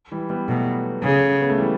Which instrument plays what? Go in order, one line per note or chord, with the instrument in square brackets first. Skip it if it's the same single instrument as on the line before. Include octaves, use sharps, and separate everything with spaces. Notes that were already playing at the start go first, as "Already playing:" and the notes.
[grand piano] E3 G3
G3 B3
[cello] B2 [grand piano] F#3 A3
[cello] C#3
[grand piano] B3
A3
E3 G3